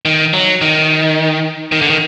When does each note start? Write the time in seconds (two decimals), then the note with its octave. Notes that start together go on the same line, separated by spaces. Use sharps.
0.05 D#3
0.33 F#3
0.61 D#3
1.72 D#3
1.82 D3
1.90 D#3